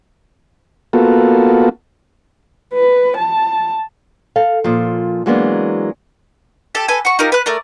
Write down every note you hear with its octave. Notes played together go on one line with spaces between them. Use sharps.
A#3 B3 F4 F#4 A4
B4
A5
A4 F5
A#2 F3
E3 F#3 G#3 A#3 B3 D4
G4 A4 A5
A4 B4 G#5
F#4 C#6
D#4 F4 G4 A#4
B4 F#6
A3 A#4 D5